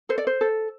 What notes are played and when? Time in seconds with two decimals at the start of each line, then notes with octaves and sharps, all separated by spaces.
0.09 A4 C5
0.18 D5
0.27 C5
0.41 A4